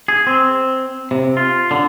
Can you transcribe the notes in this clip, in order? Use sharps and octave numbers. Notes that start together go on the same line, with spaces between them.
G#4
C4
C3
F4
D3